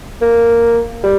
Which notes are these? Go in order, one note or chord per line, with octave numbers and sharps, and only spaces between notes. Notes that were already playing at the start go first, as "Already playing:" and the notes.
A#3
G3